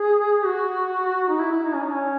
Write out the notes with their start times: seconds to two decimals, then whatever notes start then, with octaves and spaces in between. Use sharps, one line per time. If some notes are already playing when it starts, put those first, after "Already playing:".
Already playing: G#4
0.45 F#4
1.29 D#4
1.39 E4
1.52 E4
1.63 D#4
1.75 C#4
1.84 D#4
1.92 C#4